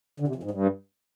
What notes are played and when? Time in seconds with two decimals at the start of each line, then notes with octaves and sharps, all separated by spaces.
0.20 D3
0.28 C3
0.36 F2
0.43 G#2
0.51 G2